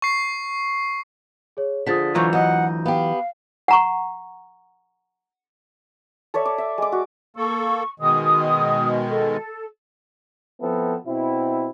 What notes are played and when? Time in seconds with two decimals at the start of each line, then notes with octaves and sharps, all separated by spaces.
0.02 C#6 C7
1.57 G#4 C#5
1.86 D3 F3 G#4 D#6 A6 B6
2.15 E3 F#3 F4 A#5 C#6 G6
2.33 D2 D#5 F#5
2.86 B3 G4 F5
3.68 F#5 A#5 C#6
6.34 A4 C#5 D5 E5
6.45 D6
6.58 E5
6.78 G#3 D6
6.92 F#4
7.36 A#3 A4 C#6
8.00 B2 D#3 G#3 D#6
9.10 A4
10.61 F3 B3 C4 E4 A4
11.07 B2 C4 E4